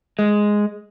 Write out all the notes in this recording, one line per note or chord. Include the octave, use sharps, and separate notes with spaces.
G#3